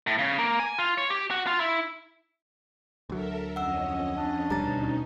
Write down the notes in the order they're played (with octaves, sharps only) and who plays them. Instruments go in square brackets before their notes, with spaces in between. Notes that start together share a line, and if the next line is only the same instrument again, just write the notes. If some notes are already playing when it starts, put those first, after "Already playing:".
[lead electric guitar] A2
C#3
A#3
G#5
F4
C#5
G4
F#4
F4
E4
[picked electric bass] D2 F#3 [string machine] A4 A#4 E5
[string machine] F2 C#4 D#5 [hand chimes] F#5 E6
[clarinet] D4
[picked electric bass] D#1 D2 G3 [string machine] B2 C#4 D#4 [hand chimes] A#5 A6